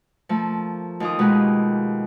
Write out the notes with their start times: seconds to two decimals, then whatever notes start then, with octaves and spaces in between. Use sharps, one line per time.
0.29 F3 A3 A#3
1.00 D#2 F4 D#6
1.19 B2 G#3 A#3 G4 B4